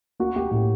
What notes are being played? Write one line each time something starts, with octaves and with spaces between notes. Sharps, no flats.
A#3 F#4
A#3 G4
A2 G4